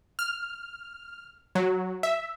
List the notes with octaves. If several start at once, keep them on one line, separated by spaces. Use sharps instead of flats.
F6
F#3
E5